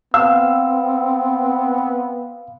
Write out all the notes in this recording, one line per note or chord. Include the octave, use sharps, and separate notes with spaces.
B3 C4 F5 E6